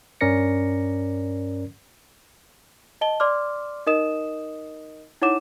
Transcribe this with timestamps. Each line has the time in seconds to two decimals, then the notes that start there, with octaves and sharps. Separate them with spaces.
0.21 G2 C#4 A#4 D5 A#6 C#7
3.01 D#5 A5 G7
3.20 D5 C6 D6 F6
3.87 D#4 A#4 D#5 D#6 E7
5.22 D#4 E4 C#5 F#5 D6 E7